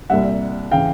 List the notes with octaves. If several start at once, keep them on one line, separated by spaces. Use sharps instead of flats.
C2 A#2 G3 E5 F#5
C#3 E3 F5 G5